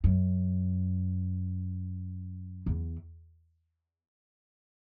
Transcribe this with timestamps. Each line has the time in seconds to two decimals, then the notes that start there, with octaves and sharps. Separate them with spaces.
0.04 F#2
2.66 E2